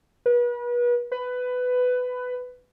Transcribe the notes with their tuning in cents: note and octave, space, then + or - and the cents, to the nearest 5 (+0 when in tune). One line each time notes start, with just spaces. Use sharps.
B4 -35
B4 +15